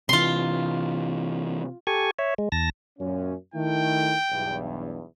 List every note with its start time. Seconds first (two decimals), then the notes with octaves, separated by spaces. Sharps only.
0.09 C3 E3 F4 C6
1.87 G4 A4 G#5 C#6
2.19 C#5 E5
2.38 G#3
2.52 E2 A5 A#6
2.99 F#2 A#2 C#4
3.54 D#3 A3 E4 G5
4.31 B1 E2 G2